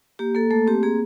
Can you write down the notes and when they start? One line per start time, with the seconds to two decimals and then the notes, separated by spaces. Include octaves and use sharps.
0.19 A#3 G4
0.35 A#3 A4
0.51 A3 A4
0.67 C4 G4
0.83 A#3 G#4